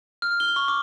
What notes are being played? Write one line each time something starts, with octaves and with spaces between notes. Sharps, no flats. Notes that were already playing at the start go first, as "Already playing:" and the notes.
F6
G7
C#6
D6